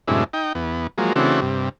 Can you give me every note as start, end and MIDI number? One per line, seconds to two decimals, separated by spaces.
0.08 0.24 42
0.08 0.24 45
0.08 0.24 48
0.08 0.24 56
0.08 0.24 62
0.08 0.24 64
0.33 0.53 63
0.33 0.53 79
0.55 0.87 40
0.55 0.87 59
0.98 1.13 53
0.98 1.13 54
0.98 1.13 56
0.98 1.13 58
1.16 1.40 49
1.16 1.40 52
1.16 1.40 57
1.16 1.40 60
1.16 1.40 62
1.16 1.40 66
1.41 1.69 43
1.41 1.69 48